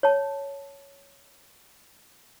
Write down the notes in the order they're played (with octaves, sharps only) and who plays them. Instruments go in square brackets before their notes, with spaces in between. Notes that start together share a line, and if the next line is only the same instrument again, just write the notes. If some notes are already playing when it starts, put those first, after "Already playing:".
[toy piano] C#5 A5